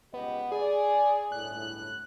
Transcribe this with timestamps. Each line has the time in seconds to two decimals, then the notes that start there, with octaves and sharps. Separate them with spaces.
0.14 C#2 B3 G4 D#5
0.52 G#4 D5
1.32 G1 C#2 A2 F#6